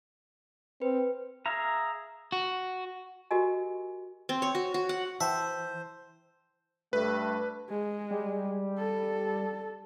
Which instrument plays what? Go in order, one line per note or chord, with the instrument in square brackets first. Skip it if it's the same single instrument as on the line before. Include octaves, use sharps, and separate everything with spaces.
[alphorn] C4 [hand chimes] B4
[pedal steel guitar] G#4 E5 F5 A#5
[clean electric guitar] F#4
[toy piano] F#4 G4 A#4 D#5 G#5
[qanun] C4
C#5
F#4
F#4
F#5
[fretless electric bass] E3 [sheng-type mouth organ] C5 [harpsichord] E5 [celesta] G5 A5
[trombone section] G2 A3 [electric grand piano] B4
[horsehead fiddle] G#3
[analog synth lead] G3
[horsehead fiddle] A4